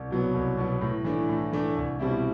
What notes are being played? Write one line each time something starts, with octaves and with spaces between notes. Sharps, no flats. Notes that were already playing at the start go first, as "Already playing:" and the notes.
Already playing: C2
B2 F#3 B3
C2
B2 F#3 B3
A2
E3 A3 D4
A2
E3 A3 D4
C2
B2 G3 C4 E4